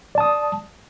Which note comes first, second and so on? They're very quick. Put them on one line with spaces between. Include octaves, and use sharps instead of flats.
D5 A5 D#6